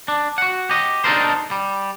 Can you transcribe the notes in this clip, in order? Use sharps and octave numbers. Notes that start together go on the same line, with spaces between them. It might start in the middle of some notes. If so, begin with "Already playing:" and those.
D4
F#4 F#5
G4 D#5
D4 D#4 F4 A4 A#4 C5
G3